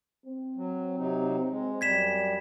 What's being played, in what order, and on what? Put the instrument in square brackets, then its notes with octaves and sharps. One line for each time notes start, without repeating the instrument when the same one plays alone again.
[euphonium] C4
[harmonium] F#3
C3 F#3 D#4
G#3
[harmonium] F#2 G3 [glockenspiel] G#6 B6 E7